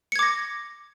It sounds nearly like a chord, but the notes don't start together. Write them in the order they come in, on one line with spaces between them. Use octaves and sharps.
C#7 G#6 D6 A#6